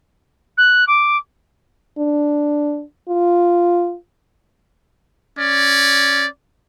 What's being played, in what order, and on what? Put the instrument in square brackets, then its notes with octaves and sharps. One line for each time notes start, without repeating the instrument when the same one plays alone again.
[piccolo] F#6
D6
[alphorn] D4
F4
[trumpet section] C#4 D5